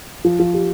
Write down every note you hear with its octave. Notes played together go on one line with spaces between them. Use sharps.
F3
F3
G4